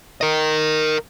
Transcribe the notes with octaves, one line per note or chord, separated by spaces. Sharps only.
A#4 D#5